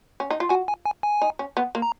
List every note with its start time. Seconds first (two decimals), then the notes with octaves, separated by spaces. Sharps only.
0.20 C#4
0.30 D#4
0.40 F4
0.49 F#4 G#5
0.68 G#5
0.86 G#5
1.03 G#5
1.22 D#4
1.39 C#4
1.57 B3
1.75 A#3
1.82 A#5